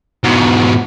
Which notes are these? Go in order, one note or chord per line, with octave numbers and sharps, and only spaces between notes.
G#2 B2